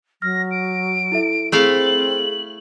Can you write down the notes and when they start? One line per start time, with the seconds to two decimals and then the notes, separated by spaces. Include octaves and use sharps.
0.22 F#3 F6 A#6
0.51 D7
1.12 E4 A4 E5
1.52 A3 C4 E4 G#4 A4 F5 F#7